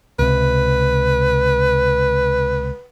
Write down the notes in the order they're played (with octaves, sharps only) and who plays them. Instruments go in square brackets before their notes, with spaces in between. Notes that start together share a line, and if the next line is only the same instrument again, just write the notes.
[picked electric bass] C#2 C3 [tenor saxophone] B4